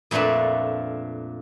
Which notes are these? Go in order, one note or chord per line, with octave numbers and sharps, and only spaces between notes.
F2 A#2 A3 D4 B4 A5